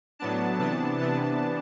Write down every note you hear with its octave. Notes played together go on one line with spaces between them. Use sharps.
A2 F#3 B3 D4 A5
C3 E3 B3 D4 A5
C3 E3 B3 D4 A5